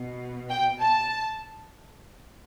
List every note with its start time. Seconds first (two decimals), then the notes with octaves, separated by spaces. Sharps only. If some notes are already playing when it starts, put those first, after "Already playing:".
Already playing: B2
0.50 G5
0.79 A5